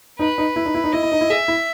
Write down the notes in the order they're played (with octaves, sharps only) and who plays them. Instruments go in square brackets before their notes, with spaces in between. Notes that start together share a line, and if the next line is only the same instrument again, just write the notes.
[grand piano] D#4 [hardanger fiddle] B4
[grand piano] D#4
E4
D#4
E4
D#4
[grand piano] E4 [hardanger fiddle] D#5
[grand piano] E4
D#4
E4
[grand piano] G#4 [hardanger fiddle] E5
[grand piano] E4